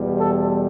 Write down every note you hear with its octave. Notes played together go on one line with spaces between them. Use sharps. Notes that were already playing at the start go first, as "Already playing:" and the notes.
Already playing: E2 B2 G3
A4